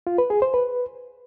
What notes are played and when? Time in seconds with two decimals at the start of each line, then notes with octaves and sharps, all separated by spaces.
0.07 F4
0.18 B4
0.30 G#4
0.42 C5
0.54 B4